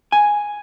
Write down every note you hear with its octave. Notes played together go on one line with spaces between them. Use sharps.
G#5